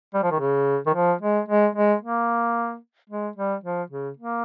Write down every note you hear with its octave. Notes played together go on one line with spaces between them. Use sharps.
G3
F3
D#3
C#3
D#3
F3
G#3
G#3
G#3
A#3
G#3
G3
F3
C#3
A#3